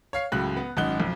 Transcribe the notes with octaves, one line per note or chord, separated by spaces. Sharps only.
C#5 F5 C7
C#2 A2 C#3 F#3 F#6
B3
G#1 F#2 D#4 F#5 F#6 G7
B1 F2